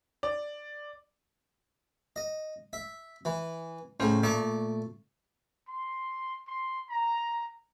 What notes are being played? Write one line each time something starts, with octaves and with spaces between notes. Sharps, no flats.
D5
D#5
E5
E3
A2 C#3 C#4 C5
A#2 A3 D5 C#6 D6
C6
C6
A#5